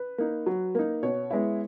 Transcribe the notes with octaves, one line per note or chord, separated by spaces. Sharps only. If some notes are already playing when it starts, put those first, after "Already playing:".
Already playing: B4
A#3 D#4
F#3
A#3 D#4
B2 C#5
G#3 B3 E4